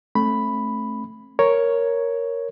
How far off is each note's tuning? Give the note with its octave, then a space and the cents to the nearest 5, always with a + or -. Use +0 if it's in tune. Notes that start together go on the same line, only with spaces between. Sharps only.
A3 +0 C4 +45 B5 +0
A#4 +5 C#5 +0